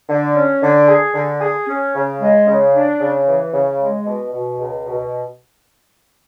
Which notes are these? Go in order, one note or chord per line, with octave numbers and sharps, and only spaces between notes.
D3
C#4
D3
G#4
D3
G#4
C#4
C#3
G#3
C#3
D4
C#3
E3
C#3
G#3
B2
B2
C#2
B2